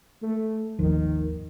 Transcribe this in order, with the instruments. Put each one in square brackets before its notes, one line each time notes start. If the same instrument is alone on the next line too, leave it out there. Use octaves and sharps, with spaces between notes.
[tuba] A3
[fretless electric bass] G#1 D#2 F3 [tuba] D#3